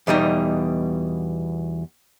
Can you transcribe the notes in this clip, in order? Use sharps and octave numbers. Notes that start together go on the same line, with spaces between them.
E2 B2 G3 D#4